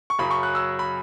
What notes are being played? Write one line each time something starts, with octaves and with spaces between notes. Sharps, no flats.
C#6
F#2 C#3 F#3 B5
C#6
F#6
E6
B5